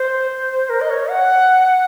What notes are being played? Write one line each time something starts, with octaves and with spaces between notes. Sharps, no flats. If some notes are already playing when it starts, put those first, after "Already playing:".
Already playing: C5
A#4
D#5
C#5
F#5